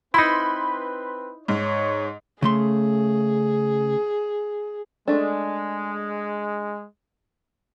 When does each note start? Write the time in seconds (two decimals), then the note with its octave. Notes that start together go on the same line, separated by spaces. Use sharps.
0.14 C4 D#4 E4 B4 B5 C6
1.48 G#2 C#5
2.42 C#3 A3 G#4 C6
5.08 G#3 A3 D4